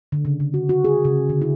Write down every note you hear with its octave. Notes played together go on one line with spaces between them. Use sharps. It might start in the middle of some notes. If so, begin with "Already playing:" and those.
D3
C#3
C#3
F#4
F#4
G#4
C#3
D3
E4